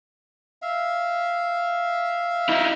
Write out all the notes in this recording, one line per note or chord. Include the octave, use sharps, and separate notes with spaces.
E5 F5
D#4 E4